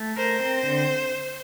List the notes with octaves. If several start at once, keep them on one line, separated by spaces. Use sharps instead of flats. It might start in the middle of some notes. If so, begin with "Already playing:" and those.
Already playing: A3
A#4 C5
C4
D3